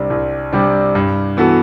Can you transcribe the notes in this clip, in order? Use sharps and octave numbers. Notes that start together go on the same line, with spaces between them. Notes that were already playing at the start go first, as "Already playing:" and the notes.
Already playing: C2 C3 G3 D4
C2
C3 G3 D4
G2
E3 B3 F#4 A4